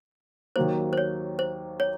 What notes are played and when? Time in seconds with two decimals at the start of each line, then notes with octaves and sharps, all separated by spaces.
0.56 D#2 D#3 F#3 A#3 C5
0.93 C5
0.98 C#5
1.39 C5
1.80 C#5